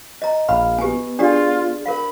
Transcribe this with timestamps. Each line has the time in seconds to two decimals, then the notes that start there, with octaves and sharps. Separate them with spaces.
0.22 D#5 A#5
0.49 A#1 F5 B5
0.78 B3 G4 G#5
1.19 D4 F4 G4 G#4 D5
1.86 A#4 F5 B5